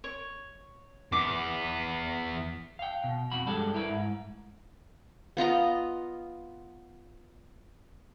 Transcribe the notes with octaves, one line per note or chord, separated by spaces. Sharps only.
C#5
E2 B3 D6
F5 G5
B2
F2 F#4 B5
G2 G#3 D4 G4 A4
E4 A#4 B4
G#2
B3 F4 D#5 A#5